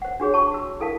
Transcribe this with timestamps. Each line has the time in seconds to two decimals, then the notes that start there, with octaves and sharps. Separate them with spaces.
0.02 C5 F#5
0.20 D4 F#4 G#4 C#5
0.34 A5 C#6
0.52 F#4 E6
0.80 E4 A4 A#4 F5 A5